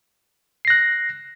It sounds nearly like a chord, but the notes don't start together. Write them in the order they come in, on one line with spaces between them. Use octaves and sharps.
C7 A#6 F#6